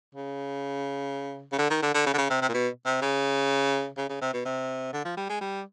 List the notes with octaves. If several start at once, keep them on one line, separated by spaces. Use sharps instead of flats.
C#3
C#3
D3
D#3
D3
D3
C#3
D3
C#3
C3
C3
A#2
B2
C3
C#3
C#3
C#3
C3
B2
C3
D3
F3
G3
G#3
G3